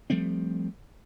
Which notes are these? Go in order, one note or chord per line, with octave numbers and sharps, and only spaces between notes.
F3 G3 A3 C4